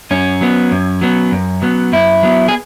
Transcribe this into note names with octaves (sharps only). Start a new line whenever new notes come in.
F#2 C#4
F#3 B3
F#2
F#3 B3
F#2
F#3 B3
F#2 E4
F#3 B3
G#4